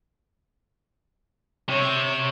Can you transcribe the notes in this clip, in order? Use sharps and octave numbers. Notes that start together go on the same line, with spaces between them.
C3 C#5